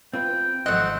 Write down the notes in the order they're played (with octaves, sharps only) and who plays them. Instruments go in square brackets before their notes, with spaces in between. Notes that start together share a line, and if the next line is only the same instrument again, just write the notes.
[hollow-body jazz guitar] C4 F4 B4 [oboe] G5
[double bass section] G#1 F#2 F3 [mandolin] A3 F#5 [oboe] C4 [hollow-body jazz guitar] D#5